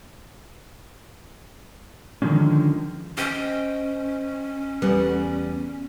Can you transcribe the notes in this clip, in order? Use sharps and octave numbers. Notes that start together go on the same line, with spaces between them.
D3 D#3 F3 G#3 C#4
C#4 C5 D#5 G5
E2 G3 B3